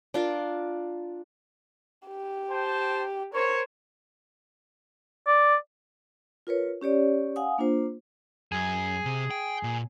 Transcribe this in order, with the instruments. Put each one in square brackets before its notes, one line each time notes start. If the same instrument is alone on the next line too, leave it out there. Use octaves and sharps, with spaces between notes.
[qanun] D4 F4 A#4
[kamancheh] G4
[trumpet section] C5 G5 A5
[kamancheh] A#4 C5 [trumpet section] C#5
[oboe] D5
[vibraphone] F4 A#4 B4 C#5
C#4 G4 C#5 D5
F5 F#5 G#5 D#6
A#3 D4 F4 C5
[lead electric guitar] F#2 [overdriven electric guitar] G#4
[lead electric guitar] C3
G5
A#2